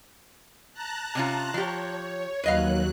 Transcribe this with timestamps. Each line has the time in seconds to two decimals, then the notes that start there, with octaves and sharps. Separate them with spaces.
0.73 A5 A#5 F#6
1.15 C3 C#4 F4
1.54 F3 G4 C#5
2.44 D#2 F#3 B4 D#5 F5 F#6